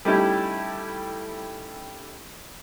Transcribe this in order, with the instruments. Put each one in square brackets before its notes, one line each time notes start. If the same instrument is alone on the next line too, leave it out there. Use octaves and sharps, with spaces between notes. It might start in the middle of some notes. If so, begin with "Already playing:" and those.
[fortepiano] G3 A3 C#4 D#4 E4 G4